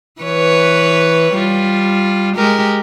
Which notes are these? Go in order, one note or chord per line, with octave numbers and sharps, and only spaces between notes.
E3 B4 C#5
G3 F4
G#3 G4 A#4